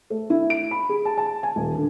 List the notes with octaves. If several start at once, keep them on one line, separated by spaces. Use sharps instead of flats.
A3
E4
D7
B5
G#4
A5
A5
G#5
D#1
D3